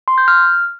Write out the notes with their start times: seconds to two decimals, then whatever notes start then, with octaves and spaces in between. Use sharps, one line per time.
0.08 C6
0.18 G6
0.28 F6